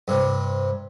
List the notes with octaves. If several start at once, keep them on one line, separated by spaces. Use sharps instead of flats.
G2 C3